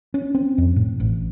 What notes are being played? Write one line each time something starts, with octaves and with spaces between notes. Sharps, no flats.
C#4
C4
F2
A2
A1